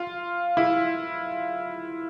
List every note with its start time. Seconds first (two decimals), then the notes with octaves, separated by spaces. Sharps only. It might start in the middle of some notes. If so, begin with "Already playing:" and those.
Already playing: F4
0.57 E4